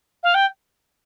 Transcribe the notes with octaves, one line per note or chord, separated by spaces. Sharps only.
F5
G5